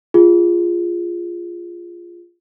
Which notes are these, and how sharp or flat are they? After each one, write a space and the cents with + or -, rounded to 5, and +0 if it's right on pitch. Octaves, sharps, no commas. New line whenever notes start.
F4 -10 G#4 -15